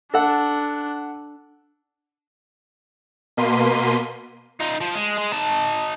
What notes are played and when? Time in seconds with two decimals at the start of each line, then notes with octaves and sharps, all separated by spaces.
0.14 D4 A4 F#5
3.37 B2 A#3 C6 B6 D#7
4.60 D#4 F4
4.81 F3
4.95 G#3
5.18 G#3
5.32 D#4 A5